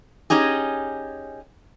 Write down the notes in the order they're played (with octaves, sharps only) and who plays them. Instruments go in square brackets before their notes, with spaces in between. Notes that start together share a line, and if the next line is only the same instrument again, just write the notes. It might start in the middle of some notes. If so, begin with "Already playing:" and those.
[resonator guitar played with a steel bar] C#4 D#4 G4 G#4